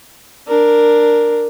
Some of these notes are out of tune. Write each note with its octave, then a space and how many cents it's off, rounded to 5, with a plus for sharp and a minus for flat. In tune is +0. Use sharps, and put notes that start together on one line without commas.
D4 +5 A#4 +0